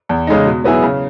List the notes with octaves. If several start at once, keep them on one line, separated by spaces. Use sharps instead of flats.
E2
C#3 G#3 D#4
B2
F#3 B3 E4 G#4
C#3